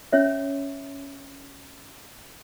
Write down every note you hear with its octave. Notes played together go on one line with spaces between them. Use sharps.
C#4 C#5 E5